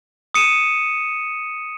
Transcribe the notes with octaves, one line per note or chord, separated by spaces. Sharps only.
D#6 C#7 D#7 E7